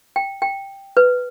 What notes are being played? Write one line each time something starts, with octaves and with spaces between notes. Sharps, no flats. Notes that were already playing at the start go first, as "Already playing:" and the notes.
G5
G5
B4